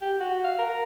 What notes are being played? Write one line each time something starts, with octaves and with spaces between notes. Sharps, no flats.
G4
F#4
F5
A#4